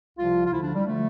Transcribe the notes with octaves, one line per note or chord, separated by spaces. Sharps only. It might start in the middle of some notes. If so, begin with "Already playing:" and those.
C2 C3 F3 F4
F4
D2 D3 F3 E4
D4
G3
D3 F3 A3